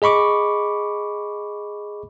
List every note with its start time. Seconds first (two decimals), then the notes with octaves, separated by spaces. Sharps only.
0.02 G#4 D#5 B5 C#6 D6